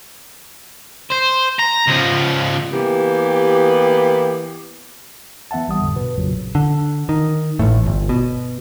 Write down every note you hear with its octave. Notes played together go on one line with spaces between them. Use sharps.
C5
A#5
C#2 F3
E3 A#3 B3 G4
E3 B3 E5 F#5 A5
A#1 G3 D#6
F2 A2 D3
G2 B2 B4
A#1 F2 A#2 C#3 F#3
D3
D#3
A1 A2
G1
B2